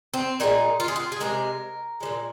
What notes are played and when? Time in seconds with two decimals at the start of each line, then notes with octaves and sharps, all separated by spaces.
0.14 C4
0.40 A#2 F3 G#3 D#4
0.80 F4
0.88 G#4
0.96 F4
1.12 G#4
1.20 C3 D#3 G#3 A#4
2.00 F3 G#3
2.05 A#2